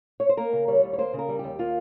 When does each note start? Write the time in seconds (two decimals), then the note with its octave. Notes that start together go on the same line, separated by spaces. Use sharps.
0.20 C#5
0.29 C5
0.37 A#3 A#4
0.53 C#3
0.68 G3 C#5
0.84 D#2
0.93 C#5
0.98 A#3 C5
1.13 C#3
1.19 A#4
1.29 G3
1.39 D#2 G4
1.59 A#3 F4